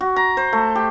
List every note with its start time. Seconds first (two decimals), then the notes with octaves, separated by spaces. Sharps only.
0.01 F#4
0.16 A#5
0.37 C5
0.53 A3
0.75 G4